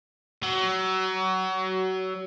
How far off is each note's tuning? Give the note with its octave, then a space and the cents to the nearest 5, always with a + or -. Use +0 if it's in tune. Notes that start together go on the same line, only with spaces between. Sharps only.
F#3 +25